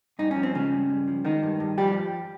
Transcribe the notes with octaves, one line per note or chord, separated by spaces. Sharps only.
G2 D#4
C#4
F3
C4
C#3 G#3 C#4
G2
G2
F3
D#3 G#3 D#4
G2
G2
F3 G3 G4